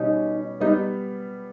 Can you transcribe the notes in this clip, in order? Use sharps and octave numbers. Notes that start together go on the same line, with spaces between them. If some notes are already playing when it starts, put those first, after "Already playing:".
Already playing: B2 G3 C#4 D#4
G3 B3 D#4